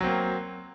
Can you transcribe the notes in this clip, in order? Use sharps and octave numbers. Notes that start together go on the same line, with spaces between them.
F#3 A#3 C4